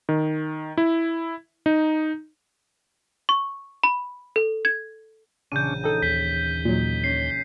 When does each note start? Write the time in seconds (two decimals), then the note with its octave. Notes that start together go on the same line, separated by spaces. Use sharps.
0.09 D#3
0.78 E4
1.66 D#4
3.29 C#6
3.83 B5
4.36 A4
4.65 G#6
5.52 A#1 C#3 E3 C#4 D4 G6 D#7
5.84 D#4 A4 G5
6.02 D#2 G6 B6
6.65 A#2 F#3 D#4
7.04 C#4 C7